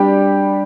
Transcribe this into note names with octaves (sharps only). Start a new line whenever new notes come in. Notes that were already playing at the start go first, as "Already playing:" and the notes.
Already playing: G3 D4 G4